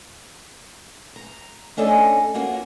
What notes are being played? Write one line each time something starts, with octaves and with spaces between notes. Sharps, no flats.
A#5
A3 C#4 D4 A4 D#5 G#5
A#3 C#4 F4 F#4 A#4